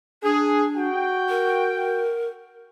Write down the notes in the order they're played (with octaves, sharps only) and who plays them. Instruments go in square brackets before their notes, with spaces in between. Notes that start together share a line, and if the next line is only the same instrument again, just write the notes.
[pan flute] D4 [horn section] G#4
[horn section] F#4 G5
[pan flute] A#4